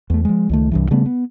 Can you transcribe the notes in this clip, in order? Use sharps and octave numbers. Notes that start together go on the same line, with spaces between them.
E2 A3
F3 G#3
C#2 D#3 A3
C2 G2 E3
C#3 G3 A3 B3
B3